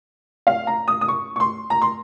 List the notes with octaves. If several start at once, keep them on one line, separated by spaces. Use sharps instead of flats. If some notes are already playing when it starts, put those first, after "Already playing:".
F5
A#5
D#6
D#6
C#6
C#6
C6
A#5
C6